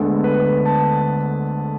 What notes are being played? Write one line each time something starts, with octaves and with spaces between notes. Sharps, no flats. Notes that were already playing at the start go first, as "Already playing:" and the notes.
Already playing: D2 D3 G#3 B3 A4
B4
A5